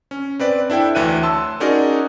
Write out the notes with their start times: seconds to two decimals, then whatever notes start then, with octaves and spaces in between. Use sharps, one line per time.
0.11 C#4
0.39 C4 B4 D5
0.70 D4 E4 A4 G5
0.95 D2 E3 C#5 E5 F#6 D#7
1.23 A5 C6 E6
1.60 C#4 D#4 F#4 G#4 A#4 D5